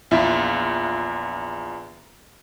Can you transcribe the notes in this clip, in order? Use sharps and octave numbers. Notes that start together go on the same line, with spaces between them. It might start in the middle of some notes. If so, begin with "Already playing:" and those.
A#1 E2 E4 F4 E5